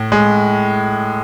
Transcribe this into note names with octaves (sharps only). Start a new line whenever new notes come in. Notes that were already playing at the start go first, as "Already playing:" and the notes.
Already playing: A2
G#3